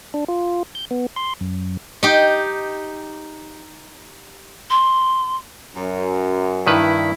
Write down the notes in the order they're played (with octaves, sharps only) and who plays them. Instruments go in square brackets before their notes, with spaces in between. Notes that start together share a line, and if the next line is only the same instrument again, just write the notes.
[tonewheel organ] D4
F4
G6
B3
C6
F#2
[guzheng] D#4 G4
[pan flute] C6
[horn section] F#2
[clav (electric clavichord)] G2 D#3 B4 [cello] E4